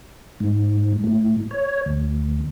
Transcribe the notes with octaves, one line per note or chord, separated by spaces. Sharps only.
G#2
A2
C#5
D2